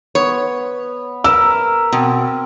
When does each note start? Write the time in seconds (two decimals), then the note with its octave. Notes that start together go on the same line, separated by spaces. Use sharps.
0.15 B3 C#5
1.24 A#4 B4 A#5 E6
1.93 B2 C4